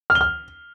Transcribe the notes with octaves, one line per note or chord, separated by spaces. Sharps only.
F6
G7
F6